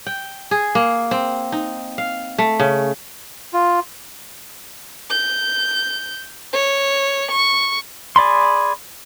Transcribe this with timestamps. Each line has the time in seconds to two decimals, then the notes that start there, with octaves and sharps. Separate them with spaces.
0.07 G5
0.51 G#4
0.75 A#3
1.11 C4
1.52 D#4
1.98 F5
2.38 A3
2.60 C#3
3.54 F4
5.11 G6
6.53 C#5
7.31 C#6
8.16 G#4 D5 B5 C6